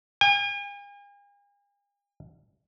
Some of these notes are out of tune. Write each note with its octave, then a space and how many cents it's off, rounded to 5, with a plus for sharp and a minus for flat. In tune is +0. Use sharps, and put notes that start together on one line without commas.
G#5 -45